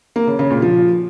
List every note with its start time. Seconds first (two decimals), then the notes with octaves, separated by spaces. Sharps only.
0.16 A#3
0.27 C#3
0.39 C#3
0.51 A#2
0.62 F3